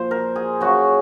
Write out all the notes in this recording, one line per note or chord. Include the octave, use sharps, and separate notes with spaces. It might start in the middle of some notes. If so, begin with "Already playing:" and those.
Already playing: A#2 F3 C5
A#4
G#4
C#3 F#3 F#4